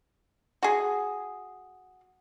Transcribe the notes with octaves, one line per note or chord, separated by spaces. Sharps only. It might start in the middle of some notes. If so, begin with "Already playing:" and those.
F#4 G#4